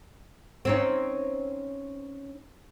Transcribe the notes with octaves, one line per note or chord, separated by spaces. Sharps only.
C4 C#4 D#4